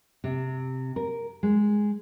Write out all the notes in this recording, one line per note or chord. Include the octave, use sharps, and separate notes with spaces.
C3
A#4
G#3